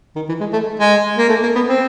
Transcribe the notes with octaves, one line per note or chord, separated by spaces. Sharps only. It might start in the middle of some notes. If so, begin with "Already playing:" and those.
D#3
E3
G#3
A3
G#3
A#3
A3
A#3
B3
C4